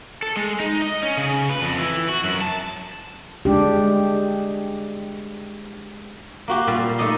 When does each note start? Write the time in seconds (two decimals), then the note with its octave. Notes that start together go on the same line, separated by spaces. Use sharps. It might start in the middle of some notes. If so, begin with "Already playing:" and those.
0.23 A4
0.37 G#3
0.60 D#4
0.82 D#5
1.02 C#4
1.18 C#3
1.49 B4
1.62 F2
1.78 E3
2.08 F#4
2.24 F#2
2.41 A5
3.45 G#3 D4 G4
6.48 A#3 F#4 G4
6.67 A#2 G3 A#4 F5
6.99 A3 D#4 A4 D5 D#5